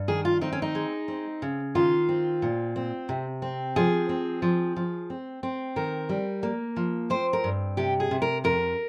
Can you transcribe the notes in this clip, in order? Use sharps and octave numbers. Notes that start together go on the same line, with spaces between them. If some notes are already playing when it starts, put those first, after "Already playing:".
Already playing: G2
D#3 G#4
F4
C4 D#4
C#4
D#4
G#3
C4
C#3
D#3 F4
C4
A#2
C4
C3
C4
F3 G#4
C4
F3
F3
C4
C4
D#3 A#4
G3
A#3
F3
C4 C5
A#4
G2
C3 G4
G#4
C3
A#4
F2 A#4